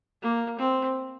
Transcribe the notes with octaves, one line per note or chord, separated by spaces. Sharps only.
A#3
C4